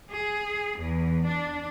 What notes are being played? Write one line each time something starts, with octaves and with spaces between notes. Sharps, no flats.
G#4
E2
D4